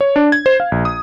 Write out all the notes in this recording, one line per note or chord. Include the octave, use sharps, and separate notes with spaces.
C#5
D4
G#6
C5
F5
A#1
D#6